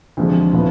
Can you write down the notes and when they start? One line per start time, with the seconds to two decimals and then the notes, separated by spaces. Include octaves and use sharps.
0.17 D2 C3 F3 G#3
0.53 A2 F3 B3 F4